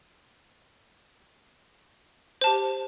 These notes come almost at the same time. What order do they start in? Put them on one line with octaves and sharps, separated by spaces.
C5 A5 G4